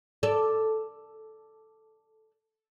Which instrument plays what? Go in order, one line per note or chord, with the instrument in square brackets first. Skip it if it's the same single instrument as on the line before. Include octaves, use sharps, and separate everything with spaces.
[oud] A4 D5